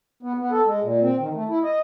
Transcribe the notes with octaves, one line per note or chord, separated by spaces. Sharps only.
B3
B3
A4
G#3
A#2
C4
D#3
A3
E4
D#5